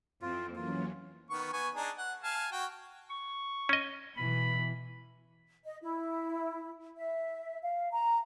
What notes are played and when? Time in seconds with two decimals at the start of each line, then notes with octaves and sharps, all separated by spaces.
0.22 F2 E3 C4 F4
0.56 E3 F#3 A#3 C#4 F4
1.30 D#3 B3 C#6
1.53 B3 G#5 C#6
1.75 D4 D#4 G#4
1.98 F#5
2.23 F5 G#5 A5
2.52 F#4 G5
3.10 C#6
3.69 C#4 D#5
4.16 B2 E3 B5
5.64 D#5
5.82 E4
6.96 E5
7.62 F5
7.91 A#5